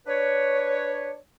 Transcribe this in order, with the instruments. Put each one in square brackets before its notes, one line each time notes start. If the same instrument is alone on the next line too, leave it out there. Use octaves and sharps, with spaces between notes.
[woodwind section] D4 B4 C#5